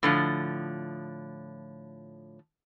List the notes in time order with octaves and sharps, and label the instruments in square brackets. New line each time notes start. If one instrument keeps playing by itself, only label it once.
[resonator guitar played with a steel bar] A2 D3 F3